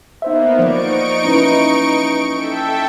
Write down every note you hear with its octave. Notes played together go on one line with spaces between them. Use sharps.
A#3 B3 D#4 C5 E5
F3 A#3 D#4 C5 D5 C#6 D7
C#4 E4 B4 A#5
A4 E5 G5